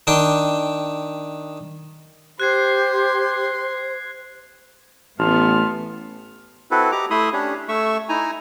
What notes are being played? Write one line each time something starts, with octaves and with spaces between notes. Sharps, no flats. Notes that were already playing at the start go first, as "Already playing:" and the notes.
D#3 D4 G5
G4 C5 C6 F#6 G#6 C7
A1 A3 B3 A5 C6 F6
C4 E4 F#4 A4 B4
G4 D#5 A#5 D6
A3 E4 E5 B5 C6 D#6
C#4 D4 G4 C#5
A3 E5 C#6 E6
D#4 E4 G#5 A#5